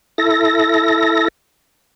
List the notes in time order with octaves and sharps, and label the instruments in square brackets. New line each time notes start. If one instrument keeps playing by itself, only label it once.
[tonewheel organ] E4 A4 A#6